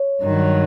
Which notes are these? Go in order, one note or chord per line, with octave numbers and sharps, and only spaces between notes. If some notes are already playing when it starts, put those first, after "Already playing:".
Already playing: C#5
G2 D#3 F#3